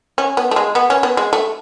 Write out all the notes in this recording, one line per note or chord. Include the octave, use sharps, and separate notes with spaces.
C#4
B3
A3
G#3
B3
C#4
B3
G#3
A3